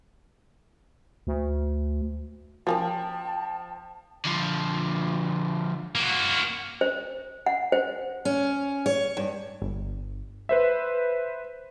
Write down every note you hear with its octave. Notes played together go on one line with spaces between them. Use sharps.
D2
F3 G3 A#3 C#4 G5 A5
D3 F3
A#3 F#4
C5
F#5
C5
C#4
C#5
G2
G1
B4 C5 E5